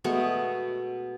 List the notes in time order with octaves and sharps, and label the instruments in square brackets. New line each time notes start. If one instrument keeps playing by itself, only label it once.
[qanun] B2 G#3 A3 C#6